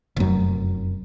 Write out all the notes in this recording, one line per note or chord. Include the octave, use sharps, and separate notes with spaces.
F1 F#2